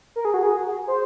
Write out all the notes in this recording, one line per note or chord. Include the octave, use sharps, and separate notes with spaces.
A#4
G#4
F#4
G#4
C5